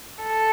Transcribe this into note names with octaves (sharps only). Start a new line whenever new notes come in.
A4